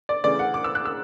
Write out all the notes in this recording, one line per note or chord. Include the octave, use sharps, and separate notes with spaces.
D5
C#3 E3 A3 D5
F#5
D6
E6
F#6
E6